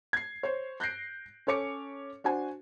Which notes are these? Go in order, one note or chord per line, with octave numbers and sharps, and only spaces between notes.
G#6 C7
C5 C#5
F#6 G6 A#6 C7 D7
C#4 A4 C#5 D6 C#7
D4 F#4 C5 G#5